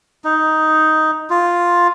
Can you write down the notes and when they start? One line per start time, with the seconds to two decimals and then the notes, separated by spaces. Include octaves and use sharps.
0.24 D#4
1.30 F4